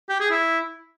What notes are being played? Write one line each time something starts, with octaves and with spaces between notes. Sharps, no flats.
G4
G#4
E4